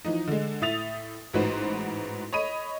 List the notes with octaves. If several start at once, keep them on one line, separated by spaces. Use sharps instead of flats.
E3 F3 D#4
D3 G#3
A2 E5 D#6 A6 F7
A1 G#2 F#4 B4 C5
C#5 D#5 B5 D#7